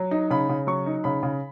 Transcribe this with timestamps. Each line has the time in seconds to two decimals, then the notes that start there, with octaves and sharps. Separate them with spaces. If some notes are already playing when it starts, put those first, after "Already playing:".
Already playing: F#3
0.11 D#4
0.31 C#3 B5
0.49 C#3
0.67 F#3 C#6
0.86 D#4
1.04 C#3 B5
1.23 C#3